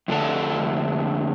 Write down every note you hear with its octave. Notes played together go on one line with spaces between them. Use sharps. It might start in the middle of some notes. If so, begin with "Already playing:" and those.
F2 D3 A3 D4 A4